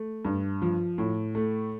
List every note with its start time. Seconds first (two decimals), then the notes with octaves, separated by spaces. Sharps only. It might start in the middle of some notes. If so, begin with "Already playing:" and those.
Already playing: A3
0.25 G2
0.62 F3
0.98 A2
1.35 A3